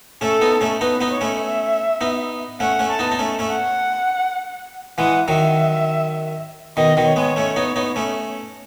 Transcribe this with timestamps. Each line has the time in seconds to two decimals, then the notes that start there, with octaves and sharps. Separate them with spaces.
0.21 A3 C#4 A4
0.41 B3 D#4
0.61 A3 C#4
0.81 B3 D#4 B4
1.01 B3 D#4
1.11 C#5
1.21 A3 C#4
1.41 E5
2.01 B3 D#4
2.60 A3 C#4 F#5
2.79 A3 C#4
2.90 A5
2.99 B3 D#4
3.12 D#4
3.19 A3 C#4
3.39 A3 C#4
3.49 F#5
4.98 E3 G#3 F#5
5.28 D#3 F#3 E5
6.77 B2 D#3 D#5
6.97 B2 D#3
7.07 C#5
7.16 G#3 B3
7.36 A3 C#4
7.56 B3 D#4
7.76 B3 D#4
7.96 A3 C#4